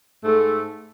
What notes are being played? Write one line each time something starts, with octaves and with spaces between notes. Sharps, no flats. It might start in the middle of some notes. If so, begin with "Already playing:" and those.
G#2 A3